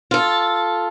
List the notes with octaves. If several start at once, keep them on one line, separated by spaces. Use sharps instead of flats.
F4 A4